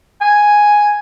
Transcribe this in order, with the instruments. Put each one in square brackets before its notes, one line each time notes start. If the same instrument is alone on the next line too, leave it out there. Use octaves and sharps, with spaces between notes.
[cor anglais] G#5